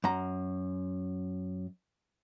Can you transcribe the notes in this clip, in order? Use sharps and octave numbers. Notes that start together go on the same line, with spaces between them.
F#2 A#5